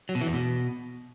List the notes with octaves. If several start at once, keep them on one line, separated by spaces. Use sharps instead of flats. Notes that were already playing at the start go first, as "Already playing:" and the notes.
F#3
B2
E3
E2
B2